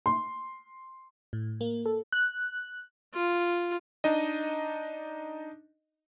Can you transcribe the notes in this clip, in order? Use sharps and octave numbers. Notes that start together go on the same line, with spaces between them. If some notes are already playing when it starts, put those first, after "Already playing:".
C6
A2
A#3
A4
F#6
F4
D4 D#4 D#5